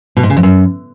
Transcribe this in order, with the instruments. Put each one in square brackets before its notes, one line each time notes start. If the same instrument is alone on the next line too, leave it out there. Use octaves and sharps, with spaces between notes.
[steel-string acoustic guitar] B2
G#2
C#3
F2
F#2